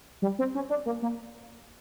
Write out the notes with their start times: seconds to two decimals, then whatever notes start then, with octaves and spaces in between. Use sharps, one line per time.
0.22 G3
0.39 C4
0.55 C#4
0.70 D4
0.86 A#3
1.02 A#3